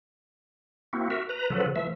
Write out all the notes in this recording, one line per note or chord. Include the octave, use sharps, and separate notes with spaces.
A#3 C4 E4 F#4
F#4 A#4 E5
B4 A#5
C#3 F3 F#3 A4 B4
E3 F3 A3 E5